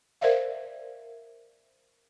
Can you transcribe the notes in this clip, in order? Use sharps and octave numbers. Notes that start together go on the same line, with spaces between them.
A#4 C5 D5 E5 F5